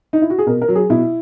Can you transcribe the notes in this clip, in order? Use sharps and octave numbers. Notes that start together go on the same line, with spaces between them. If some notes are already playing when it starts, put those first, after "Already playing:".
D#4
E4
F#4
G#4
B2 A#4
A#4
F#3
G#4
B2 E4